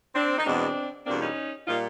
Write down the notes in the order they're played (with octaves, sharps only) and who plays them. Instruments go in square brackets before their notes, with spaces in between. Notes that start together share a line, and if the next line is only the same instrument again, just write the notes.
[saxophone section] C4 D4
D#4
E2 B2 G#3 C4 D4
E2 B2 G3 A#3 C4 D4
C#4 D#4
A#2 G3 A#3 D#4 F4